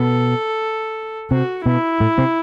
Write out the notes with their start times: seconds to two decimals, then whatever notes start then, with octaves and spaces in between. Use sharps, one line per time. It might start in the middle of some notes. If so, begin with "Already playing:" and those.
Already playing: B2 B3 A4
1.31 C3 C4 F#4
1.66 B2 B3 E4
2.00 A2 A3
2.18 C3 C4